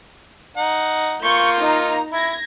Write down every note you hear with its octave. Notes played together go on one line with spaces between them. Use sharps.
D#4 F#5
A#3 F4 C#6 G6
D#4 A#5
E4 G#6 A#6